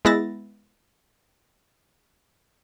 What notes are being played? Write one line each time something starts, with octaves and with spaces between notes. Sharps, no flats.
G#3 B3 E4 A6 A#6